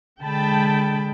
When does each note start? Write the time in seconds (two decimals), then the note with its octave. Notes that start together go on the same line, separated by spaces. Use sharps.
0.22 D3 G#3 G5 A5 B5